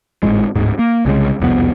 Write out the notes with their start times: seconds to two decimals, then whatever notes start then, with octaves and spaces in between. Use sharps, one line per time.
0.23 G#1 D#2 A2 G#3
0.55 D1 G#2
0.79 A#3
1.05 C2 C#3 G#3
1.40 E1 C2 F2 B3